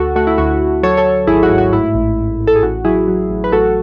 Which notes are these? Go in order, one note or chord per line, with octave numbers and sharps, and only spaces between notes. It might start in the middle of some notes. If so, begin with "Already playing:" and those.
Already playing: D2 F#4 A4
A3 F#4
E4
D2 F#4
D2
F#3 A4 C#5
A4 C#5
F#3
G#1 E4 G#4
F#4
G#2
F#4
A2 E4
A1
A1
A1
A4
G#4
A1 F#4
F#3 E4 G#4
F#3
A1
B4
A1 F#4 A4